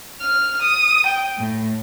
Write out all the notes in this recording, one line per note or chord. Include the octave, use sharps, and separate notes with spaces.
F6
D#6
G5
A2